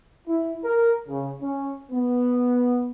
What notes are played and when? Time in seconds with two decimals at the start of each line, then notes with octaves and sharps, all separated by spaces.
0.28 E4
0.63 A#4
1.08 C#3
1.41 C#4
1.91 B3